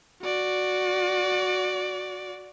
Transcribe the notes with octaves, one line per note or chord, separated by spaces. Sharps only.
F#4 D5